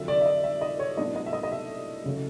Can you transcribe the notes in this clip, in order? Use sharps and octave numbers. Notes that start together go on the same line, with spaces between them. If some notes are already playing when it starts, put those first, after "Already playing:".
Already playing: F2 D3 F#3 E5
D5
E5
D#5
E5
D#5
C#5
A2 F#3 B3 D4 D#5
D#5
E5
D#5
D#5
E5
E2 C#3 F#3 A3